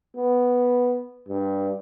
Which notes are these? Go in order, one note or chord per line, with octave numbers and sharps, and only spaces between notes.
B3
G2